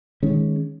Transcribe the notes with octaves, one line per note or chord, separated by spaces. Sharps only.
D#3 G#3 C#4